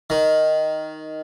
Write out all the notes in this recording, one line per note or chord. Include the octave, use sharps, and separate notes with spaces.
D#3